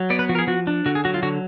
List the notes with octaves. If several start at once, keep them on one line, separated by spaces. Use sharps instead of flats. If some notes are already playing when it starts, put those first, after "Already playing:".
Already playing: F#3
B3 D5
B4
F3 F#4
A#4
G#4
F3 F#4
D4
D3 F#4
G#4
F#3 F#4
F4
D3 F#4